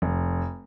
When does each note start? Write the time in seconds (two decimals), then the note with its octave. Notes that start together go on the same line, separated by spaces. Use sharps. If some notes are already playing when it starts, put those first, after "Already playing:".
0.02 F1